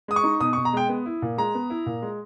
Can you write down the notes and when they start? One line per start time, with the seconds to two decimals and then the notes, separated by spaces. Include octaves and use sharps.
0.08 G#3 D#6
0.16 C#6
0.23 D#4
0.40 B2 D#6
0.53 C#6
0.57 B2
0.65 A#5
0.73 G#3 G5
0.89 B3
1.06 E4
1.22 A#2
1.38 G#3 A#5
1.54 B3
1.70 E4
1.86 A#2
2.02 G#3